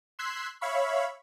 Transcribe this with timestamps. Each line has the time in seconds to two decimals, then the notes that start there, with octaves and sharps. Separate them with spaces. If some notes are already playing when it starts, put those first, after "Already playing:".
0.19 C6 E6 F#6 G#6 B6 C7
0.61 C#5 E5 F5 B5 C#6